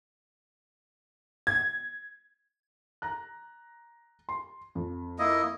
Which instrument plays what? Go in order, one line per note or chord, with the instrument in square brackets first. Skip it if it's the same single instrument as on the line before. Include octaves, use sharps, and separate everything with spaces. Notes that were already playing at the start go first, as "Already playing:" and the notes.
[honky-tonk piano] G#6
[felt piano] A#5 F#6
C6
F2
[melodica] A#3 E4 D#5